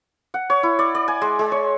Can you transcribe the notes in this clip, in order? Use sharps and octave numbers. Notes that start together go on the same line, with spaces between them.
F#5
C#5
E4
D5
D5
G#5
G#3
G#3
C#5